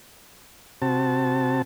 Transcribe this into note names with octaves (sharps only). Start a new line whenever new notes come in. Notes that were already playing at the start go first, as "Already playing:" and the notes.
C3 C4 F#4 A5